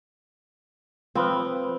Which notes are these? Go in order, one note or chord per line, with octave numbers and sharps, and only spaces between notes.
F3 C4 B4 C5